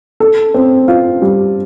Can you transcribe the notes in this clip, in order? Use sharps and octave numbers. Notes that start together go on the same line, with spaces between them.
A4
C4
F4
G3